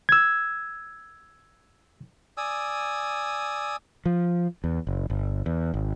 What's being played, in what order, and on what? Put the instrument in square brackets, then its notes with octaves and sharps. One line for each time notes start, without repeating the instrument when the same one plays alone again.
[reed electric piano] E6 G#6
[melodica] D5 G#5 D#6 E6
[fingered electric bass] F3
E2
F#1
G1
E2
G#1